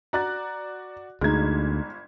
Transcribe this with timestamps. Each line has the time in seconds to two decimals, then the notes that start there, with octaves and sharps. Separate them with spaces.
0.13 F#4 D5 A#5 F#6 A6
1.21 G1 D2 G#3 D#4 G#6